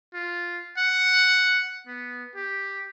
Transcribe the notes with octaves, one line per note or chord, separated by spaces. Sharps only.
F4
F#5
B3
G4